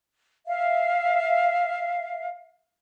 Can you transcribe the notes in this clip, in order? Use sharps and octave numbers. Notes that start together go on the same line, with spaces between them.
E5 F5